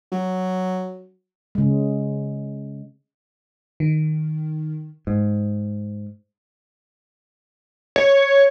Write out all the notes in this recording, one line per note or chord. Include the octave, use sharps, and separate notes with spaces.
F#3
C#3 G#3
D#3
G#2
C#5